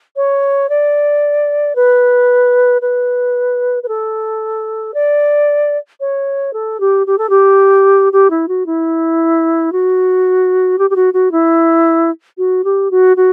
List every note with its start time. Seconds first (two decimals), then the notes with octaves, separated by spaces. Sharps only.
0.16 C#5
0.69 D5
1.76 B4
2.82 B4
3.83 B4
3.88 A4
4.94 D5
6.00 C#5
6.53 A4
6.80 G4
7.07 G4
7.18 A4
7.30 G4
8.13 G4
8.30 E4
8.48 F#4
8.66 E4
9.72 F#4
10.79 G4
10.90 G4
10.96 F#4
11.14 F#4
11.32 E4
12.38 F#4
12.64 G4
12.91 F#4
13.17 F#4